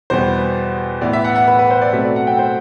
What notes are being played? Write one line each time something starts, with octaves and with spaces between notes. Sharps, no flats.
E2 B2 G3 B3 C5
A2 E3 B3 D5
E5
F#5
F#5
B4
B4
C5
D5
B2 F#3 A3 C4 E5
D5
F#5
G5
C5